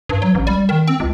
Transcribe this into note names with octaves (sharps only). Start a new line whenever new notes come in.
G2
F#3
A1
G3
D#3
C4
C#2